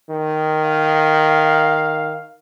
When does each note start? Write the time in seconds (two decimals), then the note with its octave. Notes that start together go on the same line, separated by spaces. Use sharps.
0.10 D#3
0.64 F5